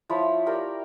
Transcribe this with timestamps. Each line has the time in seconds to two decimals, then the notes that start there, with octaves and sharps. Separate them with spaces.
0.09 F3 E4 C#5 B5
0.46 G4 A#4 D5 G5